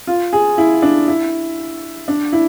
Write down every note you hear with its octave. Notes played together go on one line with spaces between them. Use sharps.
F4
G#4
E4
D4
E4
D4
E4